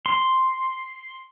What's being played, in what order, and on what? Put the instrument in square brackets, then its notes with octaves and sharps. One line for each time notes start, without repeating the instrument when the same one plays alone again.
[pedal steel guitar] C6